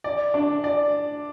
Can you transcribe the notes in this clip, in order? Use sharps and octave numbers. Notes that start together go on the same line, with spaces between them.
D5
D4
D5